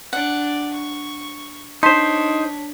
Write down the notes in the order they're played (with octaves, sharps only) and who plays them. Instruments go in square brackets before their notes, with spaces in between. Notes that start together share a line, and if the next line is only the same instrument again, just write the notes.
[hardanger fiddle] D4 D5 [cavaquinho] F#5
[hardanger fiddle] C#6
[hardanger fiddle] D4 C#5 [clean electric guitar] D#4 C5 [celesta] A5 B6 [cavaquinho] C6